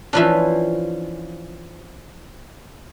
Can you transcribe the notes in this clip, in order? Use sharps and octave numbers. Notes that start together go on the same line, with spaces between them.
E3 F3 C#4 D4 B4 E5